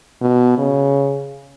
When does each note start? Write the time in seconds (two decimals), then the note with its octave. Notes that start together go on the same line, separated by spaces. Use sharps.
0.21 B2
0.58 C#3